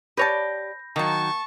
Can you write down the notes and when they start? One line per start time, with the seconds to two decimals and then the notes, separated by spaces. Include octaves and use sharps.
0.17 G4 B4 C#5 D5 A5 B5 G6 A#6
0.96 D#3 F#3 A#3 A5 C#6